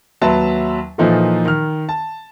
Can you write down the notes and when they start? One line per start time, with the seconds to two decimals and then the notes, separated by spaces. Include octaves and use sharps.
0.21 D#2 F#3 B4 E5 A5 C6
0.98 A#2 E3 F3 D#4 F4 A4
1.46 D#3 F6
1.89 A5